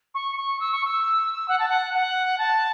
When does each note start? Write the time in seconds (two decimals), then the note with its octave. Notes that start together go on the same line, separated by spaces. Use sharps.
0.15 C#6
0.37 C#6
0.60 E6
0.72 C#6
0.85 E6
1.48 F#5
1.59 A5
1.69 F#5
1.94 F#5
2.38 A5